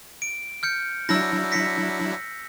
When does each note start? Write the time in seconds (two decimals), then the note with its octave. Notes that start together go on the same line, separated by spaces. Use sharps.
0.22 D7
0.63 F6 G6 C#7
1.09 F#3 D4 E4 E6 A#6
1.52 A#6 B6 C#7